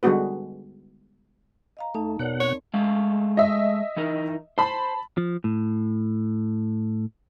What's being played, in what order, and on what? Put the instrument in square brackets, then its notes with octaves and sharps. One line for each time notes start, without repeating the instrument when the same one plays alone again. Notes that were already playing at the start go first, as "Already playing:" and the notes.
[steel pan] D3 G3 G#3 B3 F#4 B4
[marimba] D#5 F5 A#5
[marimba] E2 D#4 A5 [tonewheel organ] A3
[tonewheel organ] B2 F#5 [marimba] A#4 C#5 D5
[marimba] C4 [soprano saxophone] C#5
[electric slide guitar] G#3 A3 F5
[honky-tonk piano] D#5 E5
[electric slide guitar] E3 D#4 A#4
[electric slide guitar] C5 [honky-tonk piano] A5 B5
[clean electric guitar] F3
A2